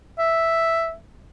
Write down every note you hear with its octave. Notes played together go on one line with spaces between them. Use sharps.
E5